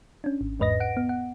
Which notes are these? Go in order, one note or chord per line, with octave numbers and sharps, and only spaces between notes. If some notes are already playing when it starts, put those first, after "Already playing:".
C#4 D4
G#1
E2 G#2 B4 D#5 A#6
F#5 D7
B3
F#5